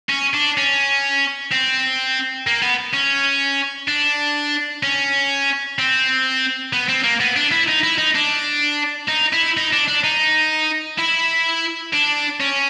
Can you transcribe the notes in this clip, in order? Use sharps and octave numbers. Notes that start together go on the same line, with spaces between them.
C#4
D4
C#4
C4
A#3
B3
C#4
D4
C#4
C4
B3
C4
A#3
B3
D4
E4
D#4
E4
D#4
D4
D#4
E4
D#4
D4
D4
D#4
E4
D4
C#4